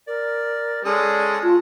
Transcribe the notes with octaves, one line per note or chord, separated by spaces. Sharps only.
A#4 D5
G#3 C#4 A4 D5 D#6
F4 A5